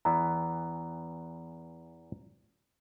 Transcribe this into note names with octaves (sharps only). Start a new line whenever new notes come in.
E2 E3 B3 A#5